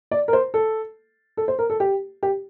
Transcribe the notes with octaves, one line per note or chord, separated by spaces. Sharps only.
D5
A#4
C5
A4
A4
C5
A#4
A4
G4
G4